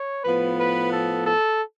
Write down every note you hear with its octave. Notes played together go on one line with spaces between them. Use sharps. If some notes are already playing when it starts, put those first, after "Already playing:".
Already playing: C#5
A2 F3 B3 B4
B4
A4
A4